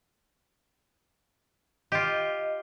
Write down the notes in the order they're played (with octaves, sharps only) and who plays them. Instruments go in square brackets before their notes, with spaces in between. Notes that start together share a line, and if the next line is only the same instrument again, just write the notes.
[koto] F4 G4 [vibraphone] D#5